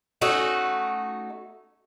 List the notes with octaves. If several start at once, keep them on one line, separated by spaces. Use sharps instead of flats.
A3 C#4 D#4 F#4